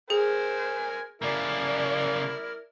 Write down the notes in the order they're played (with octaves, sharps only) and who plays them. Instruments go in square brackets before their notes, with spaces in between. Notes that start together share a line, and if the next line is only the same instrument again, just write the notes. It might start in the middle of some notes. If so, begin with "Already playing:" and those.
[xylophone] G#4 [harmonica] A#4 G#5 [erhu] C5
[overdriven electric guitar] C#3 A#3 [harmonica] E4 A#4 [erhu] D5